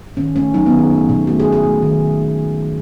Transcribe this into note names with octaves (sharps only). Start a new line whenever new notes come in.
D#3 C#4
A3 C#4
F#3 D#4
B3
D#3
G#4
A3
B2
A3 F#4
G#4
B2
G#4
A3
D#3